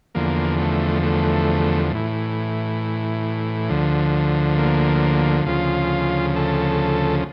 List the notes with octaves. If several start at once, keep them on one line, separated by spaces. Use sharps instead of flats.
E2 D3 F3 A#3
A3
A3
A2 E3
D2 D3 F3
A#3
D2 C#3 F3 F4
A4